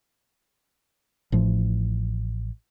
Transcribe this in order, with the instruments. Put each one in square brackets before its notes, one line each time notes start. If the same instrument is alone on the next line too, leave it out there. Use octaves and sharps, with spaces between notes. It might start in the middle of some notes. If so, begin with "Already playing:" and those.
[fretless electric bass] A1 A2 F3